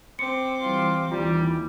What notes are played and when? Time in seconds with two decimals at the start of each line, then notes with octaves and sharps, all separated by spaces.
0.19 C4 D6 C#7
0.61 E3 G3 F4 C6
1.11 D#2 E3 G3 F4